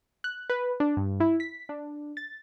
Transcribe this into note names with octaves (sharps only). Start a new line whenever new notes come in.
F#6
B4
D4
G2
E4
B6
D4
A6